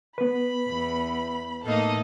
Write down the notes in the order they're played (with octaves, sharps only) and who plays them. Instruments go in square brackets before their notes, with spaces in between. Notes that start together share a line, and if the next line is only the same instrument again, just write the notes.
[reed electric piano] B3 B4 [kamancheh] B5
[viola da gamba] E2
[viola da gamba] A2 A#3 D#4 [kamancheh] A4 D#5